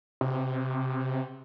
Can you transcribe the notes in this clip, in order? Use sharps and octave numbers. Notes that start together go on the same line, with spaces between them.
C3